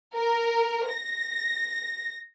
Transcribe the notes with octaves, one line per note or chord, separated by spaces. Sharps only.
A#4
A#6